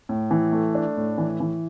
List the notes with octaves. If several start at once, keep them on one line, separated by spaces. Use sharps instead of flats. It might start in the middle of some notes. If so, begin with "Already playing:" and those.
A2
E3
A3
D4
A2
E3
E3